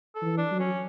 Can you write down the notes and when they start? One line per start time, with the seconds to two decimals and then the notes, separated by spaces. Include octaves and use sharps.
0.15 A4
0.22 E3
0.37 D4
0.51 F#3
0.59 C#4